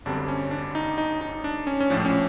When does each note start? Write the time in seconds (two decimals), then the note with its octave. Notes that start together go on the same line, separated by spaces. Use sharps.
0.05 G1 F#2 D3 G3 C4 D4
0.28 C#4
0.51 D4
0.75 D#4
0.98 D#4
1.21 D#4
1.44 D4
1.67 C#4
1.80 C#4
1.90 A#1 A2 F3 D4
2.05 C#4